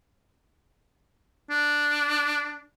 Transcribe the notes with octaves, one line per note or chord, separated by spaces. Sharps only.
D4